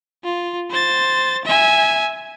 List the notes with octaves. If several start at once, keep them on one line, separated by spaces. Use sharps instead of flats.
F4
C5 A6
E5 G#5